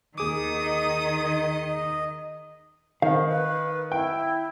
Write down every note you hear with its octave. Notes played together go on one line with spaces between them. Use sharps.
D#2 D#3 G#4 D6 D#6
D#5
D#3 C5 F5
B4
E4 G5